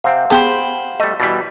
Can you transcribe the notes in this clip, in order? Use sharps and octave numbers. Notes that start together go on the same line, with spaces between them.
C3 C4 F5 F#5
B3 G4 G#4 C5 G5 A5 B5
G3 A3 D#5
B2 E3 G3 A6 B6